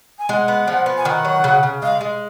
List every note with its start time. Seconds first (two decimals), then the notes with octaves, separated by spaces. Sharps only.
0.19 G#5
0.29 G#3 F#5
0.48 B3
0.68 F3
0.86 B3
0.97 G#5
1.05 D#3 F#5
1.25 F#3
1.44 C#3
1.63 C#3
1.82 G#3 F5
2.01 G#3